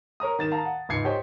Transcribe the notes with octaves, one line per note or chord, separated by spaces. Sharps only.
A#4 C#5 A#5 D#6
D#3 A6 E7
F5 A5 A#5
F#5
C#2 G#2 G#6 C7 C#7
G4 C5 C#5 D#5 G5